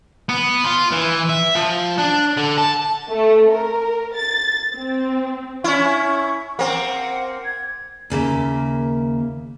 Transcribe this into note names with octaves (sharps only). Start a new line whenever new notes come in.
B3
F4
E3
E5
F3
D4
D3
A5
A3
A#4
A6
C4
C#4 E4 C#6
A#3 C4 F#5
G#6
D#2 C#3 A#3 E5